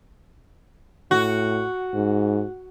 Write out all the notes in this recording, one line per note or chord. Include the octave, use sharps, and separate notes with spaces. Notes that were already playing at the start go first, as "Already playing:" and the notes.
A2 F#4
G#2